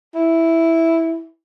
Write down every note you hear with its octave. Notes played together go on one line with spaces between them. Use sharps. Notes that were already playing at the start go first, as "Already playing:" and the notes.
E4